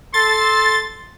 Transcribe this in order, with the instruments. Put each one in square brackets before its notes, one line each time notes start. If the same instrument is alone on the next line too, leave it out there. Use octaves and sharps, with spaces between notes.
[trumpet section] A4 C6 [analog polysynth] A6